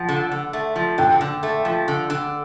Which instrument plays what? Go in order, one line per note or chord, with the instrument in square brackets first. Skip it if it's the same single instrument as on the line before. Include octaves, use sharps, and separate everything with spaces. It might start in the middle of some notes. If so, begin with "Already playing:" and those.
Already playing: [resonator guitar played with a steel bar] F3 [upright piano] F#5
[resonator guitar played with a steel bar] D3
D3
A3
F3
[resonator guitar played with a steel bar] D3 [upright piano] G5
[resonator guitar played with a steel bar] D3
A3
F3
D3
D3